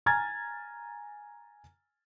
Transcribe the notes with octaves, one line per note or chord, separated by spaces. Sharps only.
G#5 A#5 F6 G#6 A6